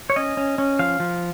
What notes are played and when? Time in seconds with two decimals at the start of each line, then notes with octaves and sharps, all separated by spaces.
0.10 C#5
0.16 C#4 D#5
0.37 C#4
0.58 C#4
0.79 F3 F5
1.00 F3